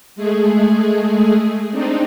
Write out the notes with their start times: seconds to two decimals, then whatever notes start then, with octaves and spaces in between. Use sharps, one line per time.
0.16 G#3 A3 G#4
1.71 C4 D4 D#4